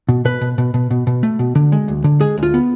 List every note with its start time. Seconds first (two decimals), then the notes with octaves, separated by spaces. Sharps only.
0.09 B2
0.25 B2 B4
0.41 B2
0.58 B2
0.74 B2
0.91 B2
1.07 B2
1.23 A3
1.39 B2
1.55 D3
1.72 G#3
1.88 D2
2.04 D3
2.20 G#3 G#4
2.38 D2
2.43 F4
2.54 B3